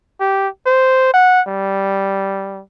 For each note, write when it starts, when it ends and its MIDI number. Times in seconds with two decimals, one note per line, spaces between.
0.20 0.48 67
0.66 1.12 72
1.14 1.41 78
1.48 2.61 55